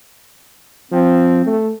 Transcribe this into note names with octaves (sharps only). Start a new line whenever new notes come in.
F3 C4
A3